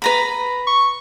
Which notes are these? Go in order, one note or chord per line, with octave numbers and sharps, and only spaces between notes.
B4 A#5 B5
C#6